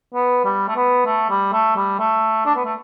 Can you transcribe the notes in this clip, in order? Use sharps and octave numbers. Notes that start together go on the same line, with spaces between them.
B3
G3
A3
B3
A3
G3
A3
G3
A3
D4
B3
A3